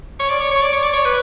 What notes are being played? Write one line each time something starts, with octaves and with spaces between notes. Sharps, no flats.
C#5
D5
C#5
C#5
D5
C#5
D5
C#5
B4